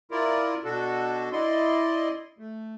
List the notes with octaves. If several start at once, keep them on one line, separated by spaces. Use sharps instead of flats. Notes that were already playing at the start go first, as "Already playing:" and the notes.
E4 F4 A#4 D5
B2 D4 F#4 A4
E4 D5 D#5 C6
A3